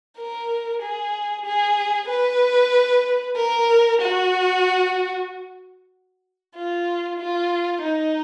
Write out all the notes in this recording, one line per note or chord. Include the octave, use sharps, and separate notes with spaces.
A#4
G#4
G#4
B4
A#4
F#4
F4
F4
D#4